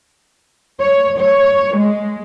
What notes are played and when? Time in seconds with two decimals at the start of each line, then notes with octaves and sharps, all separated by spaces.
0.79 C#5
1.19 C#5
1.75 G#3